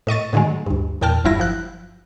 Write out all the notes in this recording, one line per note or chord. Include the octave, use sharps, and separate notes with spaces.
A2 D#5 C#6 A6
A2 D3 D#3 F#3 G#3
D2 G2
E2 A#2 G5 A5 F6
G1 G2 F#3 E4 F4 A#6
F3 F#6